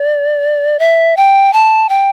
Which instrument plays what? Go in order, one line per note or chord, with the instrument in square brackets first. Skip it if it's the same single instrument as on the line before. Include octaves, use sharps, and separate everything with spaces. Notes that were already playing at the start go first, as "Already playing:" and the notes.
Already playing: [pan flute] D5
E5
G5
A5
G5